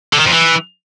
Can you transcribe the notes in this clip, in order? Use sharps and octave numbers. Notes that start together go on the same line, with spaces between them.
D3
D#3
F2
E3